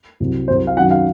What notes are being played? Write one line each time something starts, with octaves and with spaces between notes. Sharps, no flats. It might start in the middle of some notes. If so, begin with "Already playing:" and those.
C2 C3 F#3
C2 C3 F#3 C5
F5
F#2 D#3 F#3 F#5
F5